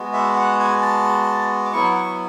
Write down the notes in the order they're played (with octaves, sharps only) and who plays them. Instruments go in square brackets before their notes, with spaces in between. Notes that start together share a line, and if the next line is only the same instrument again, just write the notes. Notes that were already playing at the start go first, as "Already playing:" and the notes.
Already playing: [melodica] G#3 B3 F#4
E5
F#5
G#5
A5
D6
F#3 B3 E4 C#6
C#6